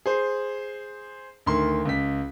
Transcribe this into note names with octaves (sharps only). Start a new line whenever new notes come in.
G#4 C5
D2 D#3 C6
C#2 B6